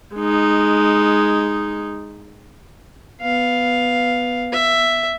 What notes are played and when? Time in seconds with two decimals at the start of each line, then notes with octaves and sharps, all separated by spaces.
0.15 G#3 D#4
3.21 B3 F5
4.53 E5